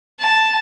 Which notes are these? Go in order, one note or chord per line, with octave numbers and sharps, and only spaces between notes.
A5